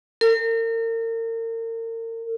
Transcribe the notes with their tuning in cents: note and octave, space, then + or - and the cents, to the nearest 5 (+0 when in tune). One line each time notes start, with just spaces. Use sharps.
A#4 -40